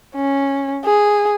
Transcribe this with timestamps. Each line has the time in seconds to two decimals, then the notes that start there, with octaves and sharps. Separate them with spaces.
0.16 C#4
0.85 G#4